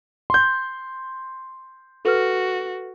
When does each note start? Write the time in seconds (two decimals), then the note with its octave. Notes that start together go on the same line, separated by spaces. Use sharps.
0.30 C6 G6
2.05 F#4 A4 B4 F6